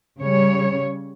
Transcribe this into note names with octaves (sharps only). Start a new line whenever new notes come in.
C#3 G3 C#5